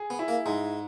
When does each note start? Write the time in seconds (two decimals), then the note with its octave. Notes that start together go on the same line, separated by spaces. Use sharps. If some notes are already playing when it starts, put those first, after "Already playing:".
Already playing: G#4
0.10 B3
0.19 E4
0.28 A#3
0.46 G#2 G#3